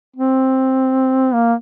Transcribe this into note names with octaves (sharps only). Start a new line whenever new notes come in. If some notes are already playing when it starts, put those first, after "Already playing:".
C4
A#3